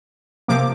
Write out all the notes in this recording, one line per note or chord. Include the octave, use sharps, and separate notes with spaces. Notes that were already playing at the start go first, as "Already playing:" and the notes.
C3 F3 A#3 D6